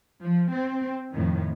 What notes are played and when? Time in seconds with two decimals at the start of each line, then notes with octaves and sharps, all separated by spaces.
0.22 F3
0.53 C4
1.12 F2 A2 D#3